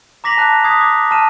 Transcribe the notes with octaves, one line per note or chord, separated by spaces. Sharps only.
A#5 D6 A#6 B6 F7 F#7
A5 F#6 C7
D#6 F#6 G#6 B6 C7
D6 G#6
A5 B5 F6 C7 D#7 E7